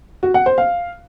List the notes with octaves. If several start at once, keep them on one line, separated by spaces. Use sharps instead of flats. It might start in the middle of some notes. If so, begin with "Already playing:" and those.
F#4
F#5
C5
F5